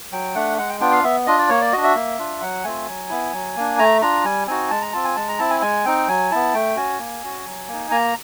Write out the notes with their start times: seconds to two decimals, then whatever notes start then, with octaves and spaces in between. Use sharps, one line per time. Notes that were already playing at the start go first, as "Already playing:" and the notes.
0.12 F#3 G5
0.35 A3 D4 F#5
0.58 G#3 F#5
0.69 G5
0.80 B3 D4 F4 G5
0.92 F5
1.04 B3 E5
1.26 D4 F4 D#5
1.38 D5
1.49 A#3 C#5
1.61 D5
1.72 D4 F#4 D#5
1.84 E5
1.95 A#3
2.19 D4 F4
2.41 F#3 F#5
2.64 A3 C4 F4 G#5
2.88 F#3
3.09 B3 E4
3.33 F#3
3.56 A#3 D4
3.78 A3 A#5
4.02 D4 F4 A#5
4.24 G3 G#5
4.47 C4 D#4 F#4 G#5
4.70 G#3 A5
4.82 A#5
4.93 C4 F4 A5
5.04 G#5
5.16 G#3 A5
5.28 A#5
5.39 C4 E4 A5
5.50 G#5
5.62 G#3 G#5
5.85 C4 D#4 G5
6.08 F#3 G#5
6.31 B3 E4 A5
6.54 A3 G5
6.76 C#4 F#4 G#5
6.99 A#3
7.23 C#4 F#4
7.46 F#3
7.68 A#3 D#4
7.91 A#3 A#5